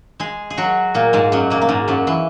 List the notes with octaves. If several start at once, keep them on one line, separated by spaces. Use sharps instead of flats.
G#3 G#4
G#4
F#3 F#4
A#2 A#3
G#2 G#3
F#2 F#3
A#2 A#3
A#3
G#2 G#3
F#2 F#3
E3